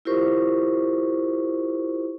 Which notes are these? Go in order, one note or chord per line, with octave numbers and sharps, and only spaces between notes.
E4 F4 G4 A#4 C5 C#6